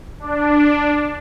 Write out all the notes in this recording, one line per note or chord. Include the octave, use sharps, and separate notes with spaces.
D4